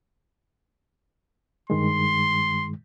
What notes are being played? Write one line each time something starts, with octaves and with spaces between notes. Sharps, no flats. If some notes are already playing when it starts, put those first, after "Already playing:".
G2 D#3 G#3 C6